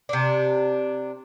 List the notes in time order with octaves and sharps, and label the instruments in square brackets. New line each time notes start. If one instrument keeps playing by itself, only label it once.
[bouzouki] C3 D4